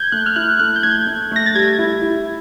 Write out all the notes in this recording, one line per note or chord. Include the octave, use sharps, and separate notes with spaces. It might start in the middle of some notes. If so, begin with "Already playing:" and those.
Already playing: G6 G#6
A3 F#6
F6
E4 F#6
A3 F#6
G6
A3 G#6
A3
A3 A#6
A6
G3 G#6
E4
E4